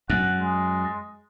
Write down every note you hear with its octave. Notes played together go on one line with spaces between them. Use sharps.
F#2 F#5
G#3